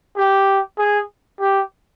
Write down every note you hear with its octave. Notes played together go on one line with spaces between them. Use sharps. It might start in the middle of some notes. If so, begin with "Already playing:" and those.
G4
G#4
G4